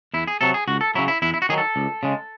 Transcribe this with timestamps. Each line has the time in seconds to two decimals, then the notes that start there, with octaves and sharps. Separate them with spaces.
0.14 E2 E4
0.28 G#4
0.41 C3 F#3 A4
0.54 G#4
0.68 C#2 F#4
0.81 A4
0.95 C#3 F#3 E4
1.08 E4
1.22 E2 E4
1.34 E4
1.42 F#4
1.49 D#3 F#3 G#4
1.58 A4
1.76 C#2
2.03 C#3 G#3